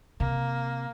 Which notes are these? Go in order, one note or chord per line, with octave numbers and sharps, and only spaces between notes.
C3 A#3